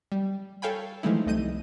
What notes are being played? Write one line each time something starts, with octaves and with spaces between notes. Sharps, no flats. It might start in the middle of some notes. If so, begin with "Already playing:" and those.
G3
A4 C#5 F5 G5 G#5 B5
E3 F3 G#3 A3 D#4 E4
C2 A3 D#5 G6 D#7